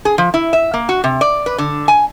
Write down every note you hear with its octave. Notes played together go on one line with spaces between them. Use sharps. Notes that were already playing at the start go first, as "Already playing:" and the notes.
G#4
F3
E4
E5
A#3
F#4
C3
D5
B4
D3
G#5